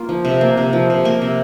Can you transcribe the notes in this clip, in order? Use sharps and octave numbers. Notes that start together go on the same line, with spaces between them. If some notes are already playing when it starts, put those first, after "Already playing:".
Already playing: A#3 F4
F3
C3
A#3
C3
F3
C3
A#3 A#4
C3